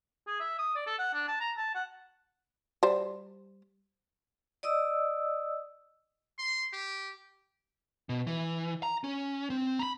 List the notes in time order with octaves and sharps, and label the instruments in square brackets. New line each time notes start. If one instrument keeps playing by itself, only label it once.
[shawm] G#4
E5
D#6
D5
A4
F#5
D4
A5
A#5
A5
F#5
[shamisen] G3 C5
[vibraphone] D5 D#5 D#6 E6
[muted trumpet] C6
G4
[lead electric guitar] B2
E3
A#5
C#4
C4
A#5 B5